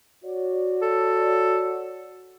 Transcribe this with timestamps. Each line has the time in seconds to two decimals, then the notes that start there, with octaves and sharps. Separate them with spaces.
0.25 F#4 C#5 D5
0.82 A4